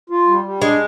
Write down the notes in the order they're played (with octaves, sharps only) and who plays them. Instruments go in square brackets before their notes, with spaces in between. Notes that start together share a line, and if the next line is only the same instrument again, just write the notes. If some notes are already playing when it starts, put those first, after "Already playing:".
[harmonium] F4
G3
G3
[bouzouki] G#3 [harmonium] D4